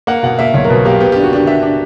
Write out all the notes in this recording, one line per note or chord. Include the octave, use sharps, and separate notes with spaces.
A#3 F#5
B2 F#5
A#3 E5
B1 C#5
A#4
B2 B4
A#3 G4
B3 G4
D4 G4
F#4
D4 G4
D4 E5
D4